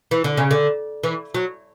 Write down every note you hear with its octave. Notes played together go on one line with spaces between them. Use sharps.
E3
D3
C#3
D3
E3
F#3